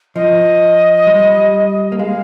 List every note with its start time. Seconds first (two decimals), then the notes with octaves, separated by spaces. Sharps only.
0.16 F3 D#5
1.07 G3
1.92 A#3
1.99 G#3 F5